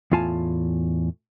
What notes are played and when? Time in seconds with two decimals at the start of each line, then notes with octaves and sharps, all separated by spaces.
0.12 E2 A2 F4 G#5 A5